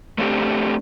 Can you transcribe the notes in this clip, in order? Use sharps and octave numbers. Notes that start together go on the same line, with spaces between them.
A3 C4 D4 G4